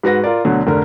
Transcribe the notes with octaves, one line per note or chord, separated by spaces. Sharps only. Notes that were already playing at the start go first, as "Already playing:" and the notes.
G#2 F#4 B4 A#6
F4 A#4 D5
D2 B2 D3 F#3
F1 D3 A#4